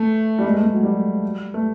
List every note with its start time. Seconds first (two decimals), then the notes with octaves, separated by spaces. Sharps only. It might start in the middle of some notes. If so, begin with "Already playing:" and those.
Already playing: A3
0.39 G3
0.45 G#3
0.54 A3
0.64 G#3
0.73 F#3
0.83 G3
1.54 A3